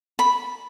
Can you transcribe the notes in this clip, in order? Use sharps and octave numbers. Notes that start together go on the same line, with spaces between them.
B5